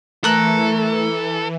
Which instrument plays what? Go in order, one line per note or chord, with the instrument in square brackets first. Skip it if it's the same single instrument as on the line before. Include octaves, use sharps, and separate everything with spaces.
[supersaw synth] E3 [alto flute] A3 [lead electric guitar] A4 [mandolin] A#4 F#6